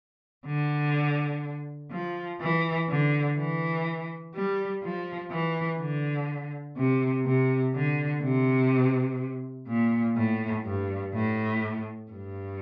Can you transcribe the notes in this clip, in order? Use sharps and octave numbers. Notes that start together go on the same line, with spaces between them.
D3
F3
E3
D3
E3
G3
F3
E3
D3
C3
C3
D3
C3
A#2
A2
G2
A2
G2